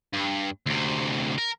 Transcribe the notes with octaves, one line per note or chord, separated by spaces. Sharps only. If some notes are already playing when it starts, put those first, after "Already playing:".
G2
D2 C3
A#4